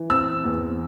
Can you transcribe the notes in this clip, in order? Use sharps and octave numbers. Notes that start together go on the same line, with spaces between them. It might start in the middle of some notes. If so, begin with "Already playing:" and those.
Already playing: E3
C4 E6
E2